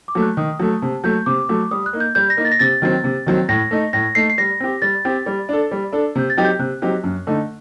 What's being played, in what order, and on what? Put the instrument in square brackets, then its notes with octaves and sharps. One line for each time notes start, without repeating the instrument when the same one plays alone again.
[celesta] D6
[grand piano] F#3 A3
[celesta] F#6
[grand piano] D#3 [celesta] D#6
[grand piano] F#3 A3
[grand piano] C3 [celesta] A5
[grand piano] F#3 A3 [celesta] G6
[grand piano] C3 [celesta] D6
[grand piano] F#3 A3
[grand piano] G3 [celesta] D#6
[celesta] F#6
[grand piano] A#3 D#4
[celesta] G6
[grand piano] G3 [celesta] G6
[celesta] A#6
[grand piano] A#3 D#4
[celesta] A6
A#6
[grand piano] C3 [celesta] A6
[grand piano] D#3 F#3 C4
C3
D#3 F#3 C4
[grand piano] A2 [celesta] A#6
[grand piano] A3 D#4
[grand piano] A2 [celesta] A#6
[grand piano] A3 D#4 [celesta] C7
[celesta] C7
[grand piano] G3 [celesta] A#6
[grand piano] C4 G4
[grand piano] G3 [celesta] A6
[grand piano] C4 G4
G3
D4 A4
G3
D4 A4
[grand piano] C3 [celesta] G6
[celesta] A6
[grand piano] F#3 C4 D#4 G4
[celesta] G6
[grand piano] C3 [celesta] F#6
[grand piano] F#3 C4 D#4 G4
F#2
D3 A3 D#4